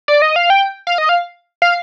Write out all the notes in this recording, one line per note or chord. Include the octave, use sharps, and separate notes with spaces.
D5
D#5
F5
G5
F5
D#5
F5
F5